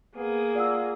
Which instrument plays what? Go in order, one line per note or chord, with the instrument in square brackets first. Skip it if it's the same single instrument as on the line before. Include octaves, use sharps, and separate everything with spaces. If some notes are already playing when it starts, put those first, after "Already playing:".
[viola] A#3 G#4 [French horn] B3
[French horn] F4 [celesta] D5 F#5 E6